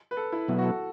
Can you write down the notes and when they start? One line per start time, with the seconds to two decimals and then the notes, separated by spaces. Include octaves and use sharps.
0.11 B4
0.17 A4
0.32 E4
0.48 B2 F#3 B3 E4
0.58 F#4
0.64 A4